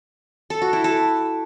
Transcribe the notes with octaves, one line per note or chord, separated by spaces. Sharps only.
A4
F#4
E4
A4